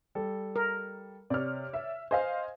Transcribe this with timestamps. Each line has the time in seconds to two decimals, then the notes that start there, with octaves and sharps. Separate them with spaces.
0.15 G3 A4
0.56 A#4
1.30 C3 C#5 D5 F6
1.73 E5
2.11 C5 D#5 F5 G#5